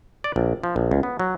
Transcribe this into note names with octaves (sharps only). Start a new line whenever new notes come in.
D5
A#1
F3
A#1
C#2
B3
F#3